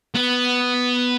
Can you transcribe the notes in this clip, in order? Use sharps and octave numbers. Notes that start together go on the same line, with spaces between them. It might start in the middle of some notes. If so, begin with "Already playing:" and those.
B3